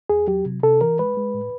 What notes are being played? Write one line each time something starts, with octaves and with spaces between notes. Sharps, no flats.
E2 G#4
F#3 G4
C3
C3 A4
E3 A#4
G#3 B4
G#3
A2